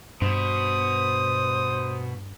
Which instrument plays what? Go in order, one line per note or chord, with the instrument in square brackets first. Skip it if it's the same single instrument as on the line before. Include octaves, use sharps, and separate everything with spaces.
[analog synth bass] G2 [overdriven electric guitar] B2 [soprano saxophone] C5 [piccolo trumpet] D#6